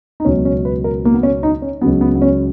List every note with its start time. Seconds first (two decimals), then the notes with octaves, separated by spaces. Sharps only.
0.20 D#4
0.25 C#2 B2 F#3 C#4
0.45 C#4
0.65 B4
0.84 A#4
1.05 A#3
1.14 B3
1.23 C#4
1.43 D#4
1.62 C#4
1.81 C#2 C#3 F#3 B3
2.01 B3
2.15 B3
2.22 C#4